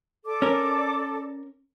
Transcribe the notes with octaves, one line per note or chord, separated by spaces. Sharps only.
A4 D5 D6
C#4 A#4